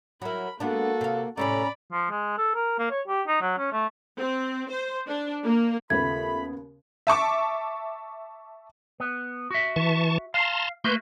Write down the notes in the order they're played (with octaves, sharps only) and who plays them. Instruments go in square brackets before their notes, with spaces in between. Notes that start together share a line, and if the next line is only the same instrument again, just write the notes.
[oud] F#3 E4 [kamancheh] A#4 B5
[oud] G#3 B3 D4 [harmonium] A#3 [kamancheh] F#4 A4
[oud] C3 F5
[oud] A2 C3 A3 [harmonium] C#4 A#5 [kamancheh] D5 B5
[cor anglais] F3
G#3
A4
A#4
A#3
C#5
G4
D#4
F#3
C#4
A3
[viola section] C4
C5
D4
A#3
[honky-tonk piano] D#2 C#3 B3 [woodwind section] A3 F4 B5 [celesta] G#6
[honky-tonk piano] E5 A5 C#6 D6
[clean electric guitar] B3
F#4 E5
[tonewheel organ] E3 A5 C#6
[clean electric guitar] F5 [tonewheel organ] A5 A#5 C6
[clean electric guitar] A3 A#3 F#4 [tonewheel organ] B4 C6 G6